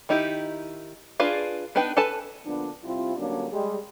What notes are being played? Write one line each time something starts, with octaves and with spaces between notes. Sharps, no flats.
D#3 D#4 E4 G4
D4 F4 G#4 B4 F5
B3 D4 D#4 B4 G5
A4 B4 G#5 A5
D3 F3 A#3 B3 D4
C3 G3 C4 E4 F4
D3 F#3 G3 A#3 C#4 D4
G3 G#3